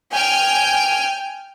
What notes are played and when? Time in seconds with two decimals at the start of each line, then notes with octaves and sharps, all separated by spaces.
0.12 G5 G#5 F6